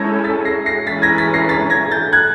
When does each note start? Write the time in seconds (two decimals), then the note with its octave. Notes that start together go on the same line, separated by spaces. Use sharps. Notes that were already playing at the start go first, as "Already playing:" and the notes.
Already playing: G#3 C#4 E4 A4 G6 G#6 A#6
0.24 A6 B6
0.45 A#6 C7
0.66 A#6 C7
0.87 E3 G#3 C#4 A6 B6
1.02 G#6 A#6
1.18 A6 B6
1.34 A#6 C7
1.49 A6 B6
1.70 G#6 A#6
1.91 G6 A6
2.13 F#6 G#6